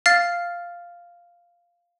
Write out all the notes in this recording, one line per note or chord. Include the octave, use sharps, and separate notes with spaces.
F5 F6 A6 C7